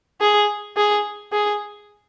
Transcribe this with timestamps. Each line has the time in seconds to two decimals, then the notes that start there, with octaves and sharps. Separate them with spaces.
0.21 G#4
0.77 G#4
1.32 G#4